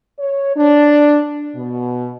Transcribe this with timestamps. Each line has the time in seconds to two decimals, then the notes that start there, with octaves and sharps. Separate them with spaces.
0.20 C#5
0.56 D4
1.56 B2